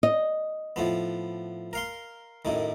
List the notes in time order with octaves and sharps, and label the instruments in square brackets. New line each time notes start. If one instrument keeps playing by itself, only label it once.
[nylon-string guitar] D#5
[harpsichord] A2 F3 B3
A#4 F5 C6
F#2 A2 D#3